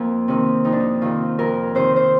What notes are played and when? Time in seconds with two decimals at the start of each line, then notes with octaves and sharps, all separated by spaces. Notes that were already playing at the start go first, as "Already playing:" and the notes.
Already playing: F2 A#3
0.28 C3 D#3 C4
0.65 F2 D#4
0.72 D4
0.80 D#4
1.01 C3 D#3 F4
1.39 F2 A#4
1.75 C3 D#3 C5
1.96 C5